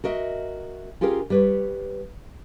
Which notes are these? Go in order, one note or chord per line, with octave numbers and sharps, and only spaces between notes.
F#4 A#4 D#5 E5
C#4 F4 G4 G#4 A#4
G3 B4 C#5